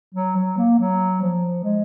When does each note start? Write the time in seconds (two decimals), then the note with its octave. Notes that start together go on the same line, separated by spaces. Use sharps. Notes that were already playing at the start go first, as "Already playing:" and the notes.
0.15 F#3
0.36 F#3
0.58 A#3
0.79 F#3
1.21 F3
1.63 G#3